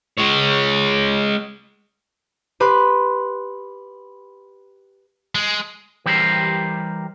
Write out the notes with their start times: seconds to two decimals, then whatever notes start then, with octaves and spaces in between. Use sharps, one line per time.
0.18 G#3 C#5
2.60 G4 B4 B5 C6 F#6
5.35 G#3
6.06 E3 G3 G4 A#4 C5